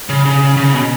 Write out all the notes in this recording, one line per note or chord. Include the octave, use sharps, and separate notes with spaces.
C#3
C#3
C#3
B2